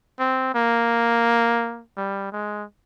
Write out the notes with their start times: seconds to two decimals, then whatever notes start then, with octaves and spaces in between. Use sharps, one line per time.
0.19 C4
0.55 A#3
1.97 G3
2.32 G#3